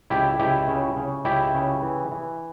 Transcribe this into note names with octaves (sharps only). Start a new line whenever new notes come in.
C#2 E4 G4
C#2 E4 G4
C#3
C#3
C#2 E4 G4
C#3
E3
E3